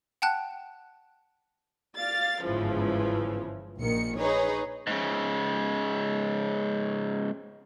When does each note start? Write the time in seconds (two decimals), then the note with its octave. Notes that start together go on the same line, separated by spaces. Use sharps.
0.22 F#5 G5 A5 F#6
1.97 D5 F5 A6
2.45 G1 G#2 C#3 E3 F3
3.79 A#1 A#2 D#3 C#7
4.15 D#4 G#4 B4 C#5
4.87 G#2 C#3